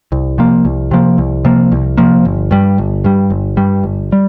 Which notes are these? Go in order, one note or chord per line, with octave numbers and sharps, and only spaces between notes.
C2
C3 F3 A#3
C2
C3 F3 A#3
C2
C3 F3 A#3
C2
C3 F3 A#3
G1
G2 G3
G1
G2 G3
G1
G2 G3
G1
G3